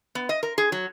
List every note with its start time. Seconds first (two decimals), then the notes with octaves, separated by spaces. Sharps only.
0.15 B3
0.29 D#5
0.43 A#4
0.58 G#4
0.72 F#3